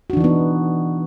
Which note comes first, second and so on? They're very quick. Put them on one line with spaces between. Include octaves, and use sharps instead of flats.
F#4 D4 E3 D#4 B3